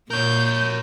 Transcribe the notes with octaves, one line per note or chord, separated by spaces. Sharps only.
A#2 A#4 C#5 G6